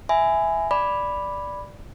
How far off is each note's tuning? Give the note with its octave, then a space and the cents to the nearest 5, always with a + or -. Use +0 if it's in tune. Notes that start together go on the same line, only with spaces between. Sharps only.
E5 +0 G#5 +0 B5 +25
D5 +0 B5 +0 D6 +0